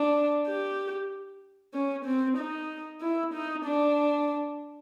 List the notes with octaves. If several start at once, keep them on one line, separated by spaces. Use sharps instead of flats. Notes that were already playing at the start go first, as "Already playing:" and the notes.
Already playing: D4
G4
C#4
C4
D#4
E4
D#4
D4